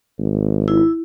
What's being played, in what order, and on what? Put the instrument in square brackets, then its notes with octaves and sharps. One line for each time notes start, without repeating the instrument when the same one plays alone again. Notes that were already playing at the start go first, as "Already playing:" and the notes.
[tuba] G#1
[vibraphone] E4